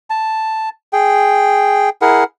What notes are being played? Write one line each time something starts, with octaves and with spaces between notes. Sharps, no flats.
A5
G#4 G5
E4 G#4 A#4 F#5